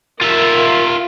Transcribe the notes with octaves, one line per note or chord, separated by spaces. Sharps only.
F4 A#4 E5